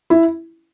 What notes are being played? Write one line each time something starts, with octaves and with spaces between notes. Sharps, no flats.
E4